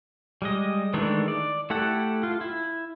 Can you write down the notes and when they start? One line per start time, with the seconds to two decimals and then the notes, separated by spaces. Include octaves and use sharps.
0.42 G3 G#3 D#5
0.94 D#3 E3 G#3 A3 D4
1.28 D5
1.70 A3 E4 G4 A4 F#5
2.23 F4
2.41 E4